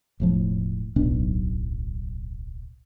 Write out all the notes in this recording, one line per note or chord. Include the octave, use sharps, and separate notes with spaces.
E1 A2 F3
D1 B1 B2 D4